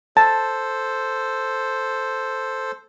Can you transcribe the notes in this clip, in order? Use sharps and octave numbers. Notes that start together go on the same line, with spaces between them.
A4 C5 A5